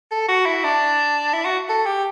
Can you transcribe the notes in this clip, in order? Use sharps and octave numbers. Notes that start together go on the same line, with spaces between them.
A4
F#4
E4
D4
E4
F#4
A4
G4